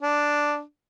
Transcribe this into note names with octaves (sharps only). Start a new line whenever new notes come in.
D4